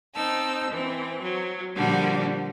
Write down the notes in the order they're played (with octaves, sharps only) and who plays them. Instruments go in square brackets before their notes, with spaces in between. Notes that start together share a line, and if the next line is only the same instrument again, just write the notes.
[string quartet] C4 D#4 A5 E6
E3 C4
F#3
A#2 D3 F3 G3 D4 F#4